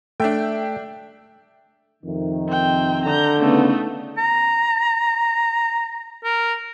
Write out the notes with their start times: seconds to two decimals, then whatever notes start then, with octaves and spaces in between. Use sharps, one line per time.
0.20 A3 D4 E5 G5
2.04 F2 C3 D#3
2.48 C4 G5
3.06 D3 A#5 G6
3.40 C#3 A3 B3 D#4
4.18 A#5
6.24 A#4